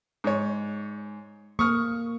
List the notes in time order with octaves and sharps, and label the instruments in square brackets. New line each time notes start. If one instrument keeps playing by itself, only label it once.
[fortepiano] G#2 C#5
[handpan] A#3 [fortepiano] C#6 D#6 F6